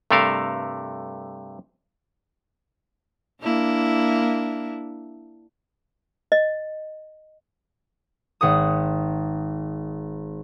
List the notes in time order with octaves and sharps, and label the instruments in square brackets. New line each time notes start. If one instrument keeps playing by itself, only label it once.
[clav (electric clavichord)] G2 C3 A3 A4 A#4 F5
[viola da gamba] A#3 D4 E4
[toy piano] D#5
[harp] G#1 F#5 D#6